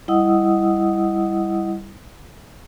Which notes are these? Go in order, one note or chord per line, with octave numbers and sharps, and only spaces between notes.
G3 E4 D#5 F#5 D#6 E6